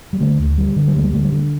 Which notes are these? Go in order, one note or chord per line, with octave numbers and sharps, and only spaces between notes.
G3
D3 A3
D2
D3 G3
D3
G3
D2 A3
G3
D3 A3
G3
D3